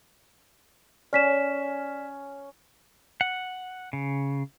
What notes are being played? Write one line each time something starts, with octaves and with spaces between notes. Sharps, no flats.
C#4 D5 B6 E7
F#5
C#3